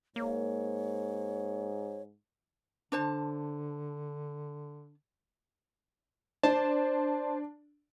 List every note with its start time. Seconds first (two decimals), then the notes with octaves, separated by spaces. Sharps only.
0.16 G#2 A#3 C#5
2.92 D3 D4 C5 A5
6.43 D4 C5 A5